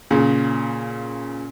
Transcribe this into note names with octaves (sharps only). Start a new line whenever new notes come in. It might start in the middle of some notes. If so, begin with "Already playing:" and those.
A#2 C#3